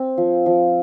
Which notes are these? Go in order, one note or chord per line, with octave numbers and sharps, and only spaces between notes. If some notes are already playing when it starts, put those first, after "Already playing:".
Already playing: C4
F3
F3